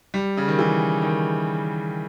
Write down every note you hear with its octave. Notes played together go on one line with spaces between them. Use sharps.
G3
C#3
D#3
E3
D#3